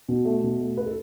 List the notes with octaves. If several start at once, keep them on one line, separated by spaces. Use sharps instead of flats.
B2
A3
B2
A3
B4
A4